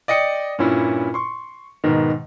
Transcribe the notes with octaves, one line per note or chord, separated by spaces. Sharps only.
D5 D#5 G5 C#7
G2 A#2 C#4 E4
C6 C#6
G#2 B2 D#3